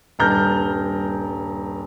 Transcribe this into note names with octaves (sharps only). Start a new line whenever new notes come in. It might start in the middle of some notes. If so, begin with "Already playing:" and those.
D#1 G2 A#5 F6 G6